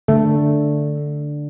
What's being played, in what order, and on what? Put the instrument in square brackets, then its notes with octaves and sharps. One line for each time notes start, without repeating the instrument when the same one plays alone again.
[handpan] D3 [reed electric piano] A3